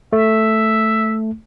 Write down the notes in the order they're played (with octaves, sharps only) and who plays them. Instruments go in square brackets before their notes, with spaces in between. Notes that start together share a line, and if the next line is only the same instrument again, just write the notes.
[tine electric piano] A3 [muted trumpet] E5